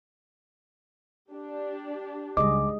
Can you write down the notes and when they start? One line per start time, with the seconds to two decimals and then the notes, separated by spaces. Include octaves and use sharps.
1.29 D4 G4
2.37 C#2 G3 G#3 G#4 D#5 D6